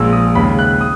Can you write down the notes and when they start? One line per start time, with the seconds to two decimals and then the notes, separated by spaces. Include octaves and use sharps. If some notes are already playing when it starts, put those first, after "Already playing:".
Already playing: A#1 A#2 G#3 E6
0.13 D#6
0.35 D#2 C#3 G#3 B5
0.59 F#6
0.81 D#6